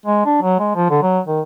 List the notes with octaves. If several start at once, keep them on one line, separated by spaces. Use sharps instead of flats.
G#3
D4
F#3
G#3
F3
D3
F#3
D#3